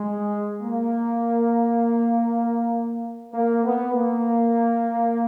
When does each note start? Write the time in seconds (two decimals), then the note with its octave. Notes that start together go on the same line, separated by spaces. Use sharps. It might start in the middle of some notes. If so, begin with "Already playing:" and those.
Already playing: G#3
0.62 A#3
3.33 A#3
3.64 B3
3.94 A#3